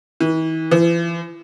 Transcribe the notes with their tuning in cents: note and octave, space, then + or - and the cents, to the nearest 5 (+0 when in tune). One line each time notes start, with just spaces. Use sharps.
E3 -40
E3 +40